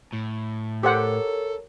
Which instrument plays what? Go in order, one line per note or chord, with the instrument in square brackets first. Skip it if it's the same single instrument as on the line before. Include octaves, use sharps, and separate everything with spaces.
[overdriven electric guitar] A2
[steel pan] G4 C5 F#5 [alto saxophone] A4 [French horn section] A#4 C#5